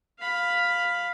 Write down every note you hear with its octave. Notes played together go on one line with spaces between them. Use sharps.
F5 B5